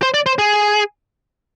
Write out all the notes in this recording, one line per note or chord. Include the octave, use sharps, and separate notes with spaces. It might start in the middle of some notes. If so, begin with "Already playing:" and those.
C5
D5
C5
G#4